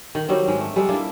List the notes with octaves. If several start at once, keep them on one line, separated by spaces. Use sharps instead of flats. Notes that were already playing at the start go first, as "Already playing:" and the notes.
D#3
D#3 F#3 G3 C4
G#2 G#3
A3
G3 G#3 A4
A#3 D4 E4 F4